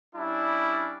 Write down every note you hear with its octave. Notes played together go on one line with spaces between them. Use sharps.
G3 C#4 D4 E4